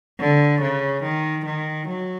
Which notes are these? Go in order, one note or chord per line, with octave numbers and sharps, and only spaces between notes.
D3
C#3
D#3
D#3
F#3